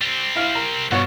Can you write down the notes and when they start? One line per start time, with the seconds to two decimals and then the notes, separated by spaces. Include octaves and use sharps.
0.01 G3 C4
0.35 E4 F5
0.55 A#4
0.91 G2 B2 F#4 C#5